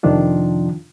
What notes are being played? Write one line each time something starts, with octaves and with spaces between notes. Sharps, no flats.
F2 C3 D#3 F3 D4 F4